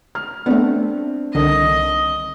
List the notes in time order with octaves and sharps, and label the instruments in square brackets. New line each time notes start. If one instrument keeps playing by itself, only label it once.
[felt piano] F6
[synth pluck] A3 B3 [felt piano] C4 D4
[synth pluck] C2 D3 D#3 [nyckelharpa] D#5